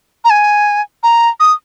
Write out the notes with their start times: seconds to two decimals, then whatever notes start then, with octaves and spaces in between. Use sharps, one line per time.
0.24 A#5
0.30 G#5
1.03 A#5
1.40 D#6